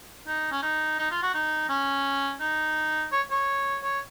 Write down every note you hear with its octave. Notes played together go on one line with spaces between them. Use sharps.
D#4
C#4
D#4
D#4
F4
F#4
D#4
C#4
D#4
C#5
C#5
C#5